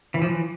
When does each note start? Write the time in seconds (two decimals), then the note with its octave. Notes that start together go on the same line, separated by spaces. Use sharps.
0.14 E3
0.22 F3
0.29 E3